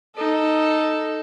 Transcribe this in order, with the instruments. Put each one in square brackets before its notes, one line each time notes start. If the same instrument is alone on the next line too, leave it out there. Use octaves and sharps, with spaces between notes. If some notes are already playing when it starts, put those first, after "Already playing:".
[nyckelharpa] D#4 A4